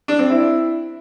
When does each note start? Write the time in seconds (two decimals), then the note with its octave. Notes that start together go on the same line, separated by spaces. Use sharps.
0.08 D4
0.19 C4
0.30 E4